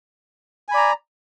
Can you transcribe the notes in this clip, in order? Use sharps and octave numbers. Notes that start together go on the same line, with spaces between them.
D5 G#5 A#5 B5